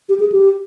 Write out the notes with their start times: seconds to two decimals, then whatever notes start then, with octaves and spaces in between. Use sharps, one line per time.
0.09 G4
0.20 G#4
0.32 G4